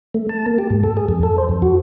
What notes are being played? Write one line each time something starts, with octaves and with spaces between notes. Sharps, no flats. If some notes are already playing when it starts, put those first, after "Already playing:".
A3
A5
A#3
G4
G#2
A4
G#4
F2
A4
C5
F2
F#4